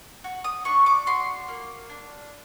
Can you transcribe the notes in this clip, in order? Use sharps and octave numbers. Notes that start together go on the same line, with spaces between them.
F#4
D#6
D4 C#6
D6
F#4 C6
A#3
D4